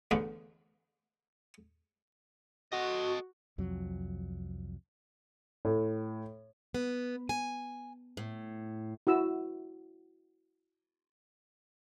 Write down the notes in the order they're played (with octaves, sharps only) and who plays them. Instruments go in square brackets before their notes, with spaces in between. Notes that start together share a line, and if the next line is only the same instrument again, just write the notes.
[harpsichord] A1 E2 D3 B3
[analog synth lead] F#4 [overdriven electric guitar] A4 D#5
[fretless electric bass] C2 F2 F#3
[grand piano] A2
[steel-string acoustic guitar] B3
G#5
A2
[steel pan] E4 F#4 E6